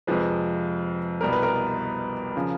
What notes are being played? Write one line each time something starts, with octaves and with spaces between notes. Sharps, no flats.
F2 C3 F3 G#3 B4
C2 B2 G3 A#4
B4
A#4
C#3 F3